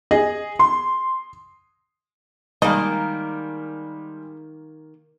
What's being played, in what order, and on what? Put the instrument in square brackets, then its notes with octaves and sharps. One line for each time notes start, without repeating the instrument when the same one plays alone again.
[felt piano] G#4 D#5
C6
[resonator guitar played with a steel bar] D#3 A#3 [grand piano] G3 G#3 [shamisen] D#5